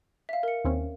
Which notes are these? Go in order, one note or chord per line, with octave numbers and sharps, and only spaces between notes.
E5 F5
A#4 C#7
D#2 C4 C#4